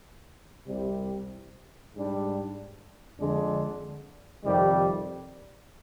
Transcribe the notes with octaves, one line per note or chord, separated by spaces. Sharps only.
C2 C3 G3
G#2 G3 D4
F2 D3 G#3 D4
F2 C3 D#3 G3